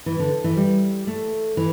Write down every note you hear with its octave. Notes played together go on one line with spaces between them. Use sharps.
E3
D3
E3
G3
A3
E3